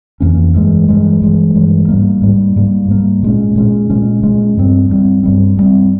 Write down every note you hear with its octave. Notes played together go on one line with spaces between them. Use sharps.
F2 E3 A#3 C#4
G2 E3 G#3
G2 E3 G#3
G2 E3 G#3
G2 E3 G#3
G#2 G3 A#3
G#2 G3 A#3
G#2 G3 A#3
G#2 G3 A#3
A#2 G#3 C#4
A#2 G#3 C#4
A#2 G#3 C#4
A#2 G#3 C#4
G2 G3 C4
G2 G3 C4
G2 G3 C4
G2 G3 C4